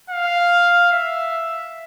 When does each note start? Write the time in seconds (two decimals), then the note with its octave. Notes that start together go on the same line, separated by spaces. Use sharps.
0.10 F5
0.92 E5